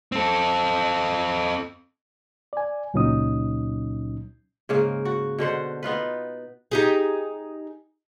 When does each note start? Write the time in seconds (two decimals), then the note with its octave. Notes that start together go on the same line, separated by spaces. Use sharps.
0.12 C4 A4
2.53 D5 G#5
2.94 C#2 A#2 F#3 C#4 D#4 D#6
4.69 G#2 C#3 A#3
5.05 F#4
5.38 B2 D3 C5 F#5
5.83 B3 D#4 F4 B4
6.71 D#4 G4 G#4